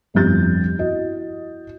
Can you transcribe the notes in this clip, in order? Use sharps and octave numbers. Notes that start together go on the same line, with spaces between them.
G1 C2 F2 G4 G6 A6
E4 F#4 D#5